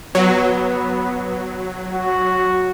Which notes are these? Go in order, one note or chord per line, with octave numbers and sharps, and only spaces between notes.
F#3 B3
F#4